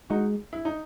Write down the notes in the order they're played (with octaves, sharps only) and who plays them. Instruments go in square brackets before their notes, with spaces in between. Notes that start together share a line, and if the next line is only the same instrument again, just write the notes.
[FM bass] G#3 [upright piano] D#4 F#4
[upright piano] E4
D#4